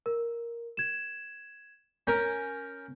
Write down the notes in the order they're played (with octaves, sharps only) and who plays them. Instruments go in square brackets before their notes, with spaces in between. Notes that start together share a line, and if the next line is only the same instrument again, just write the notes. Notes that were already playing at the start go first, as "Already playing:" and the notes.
[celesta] A#4
G#6 E7
[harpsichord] C#4 A#4 [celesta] G6